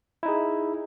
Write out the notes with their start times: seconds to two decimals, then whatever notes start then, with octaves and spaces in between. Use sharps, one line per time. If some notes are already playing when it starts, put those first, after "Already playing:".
0.23 E4
0.26 D#4
0.28 G#4